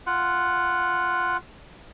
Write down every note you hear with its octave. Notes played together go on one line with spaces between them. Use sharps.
F4 F#5